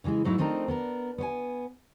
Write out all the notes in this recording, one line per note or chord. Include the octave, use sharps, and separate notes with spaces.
C#3 E3 G3 G#3 E4
G#2 F#3 A3 D#4 E4
F3 A3 C4 D4 D#4 A#4
B3 D4 A#4
B3 C5 G#5